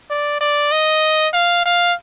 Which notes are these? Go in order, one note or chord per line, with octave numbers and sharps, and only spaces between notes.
D5
D5
D#5
F5
F5